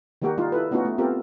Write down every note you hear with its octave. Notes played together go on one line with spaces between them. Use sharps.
D#3 G3 A#3 F#4 G4 A#4
G3 D#4 F4
E4 A4 B4
A3 B3 C#4 D#4 F4 F#4
A3
B3 C4 F4 G4 A4 A#4